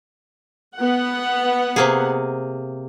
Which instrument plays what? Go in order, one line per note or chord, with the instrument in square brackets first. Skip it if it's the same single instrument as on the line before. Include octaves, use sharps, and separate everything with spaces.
[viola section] B3 F#5
[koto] C3 A#3 G#4